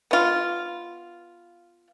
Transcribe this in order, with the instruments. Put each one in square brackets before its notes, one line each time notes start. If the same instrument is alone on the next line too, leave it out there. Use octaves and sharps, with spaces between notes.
[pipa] B3 F4